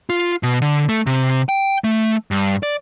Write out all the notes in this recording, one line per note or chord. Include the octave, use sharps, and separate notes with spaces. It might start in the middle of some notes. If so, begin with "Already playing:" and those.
F4
B2
D3
A3
C3
G5
A3
G2
D5